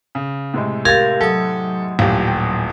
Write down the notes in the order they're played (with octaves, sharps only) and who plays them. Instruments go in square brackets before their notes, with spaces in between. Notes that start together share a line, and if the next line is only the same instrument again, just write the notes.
[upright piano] C#3
A2 C3 G#3
[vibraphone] G4 A#4 F5 [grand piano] G#6 A6
[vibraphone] F#3 D#6 [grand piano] A4
[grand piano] D#1 A1 [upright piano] F4 G4
[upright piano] G5